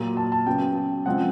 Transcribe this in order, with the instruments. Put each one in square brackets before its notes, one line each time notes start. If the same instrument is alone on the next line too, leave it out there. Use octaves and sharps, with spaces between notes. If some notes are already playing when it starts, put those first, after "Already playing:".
Already playing: [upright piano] A#2 F#3 A#3
A5
A5
C#3 F#3 B3 G5
C#3 F3 G#3 C4 F#5